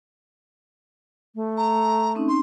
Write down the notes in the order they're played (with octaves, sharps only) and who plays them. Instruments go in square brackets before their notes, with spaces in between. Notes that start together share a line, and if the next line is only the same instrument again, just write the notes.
[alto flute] A3
[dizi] A#5
[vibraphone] C4 C#4 D#4
[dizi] C6